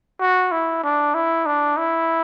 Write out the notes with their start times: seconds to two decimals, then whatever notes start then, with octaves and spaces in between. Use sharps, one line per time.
0.20 F#4
0.52 E4
0.83 D4
1.14 E4
1.46 D4
1.77 E4